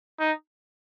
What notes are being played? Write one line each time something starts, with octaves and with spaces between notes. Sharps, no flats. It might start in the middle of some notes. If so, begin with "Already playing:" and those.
D#4